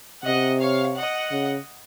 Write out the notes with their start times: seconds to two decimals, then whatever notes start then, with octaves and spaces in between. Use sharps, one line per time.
0.23 C3 D#5 F#5
0.59 C#5 F5
0.95 D#5 F#5
1.32 C#3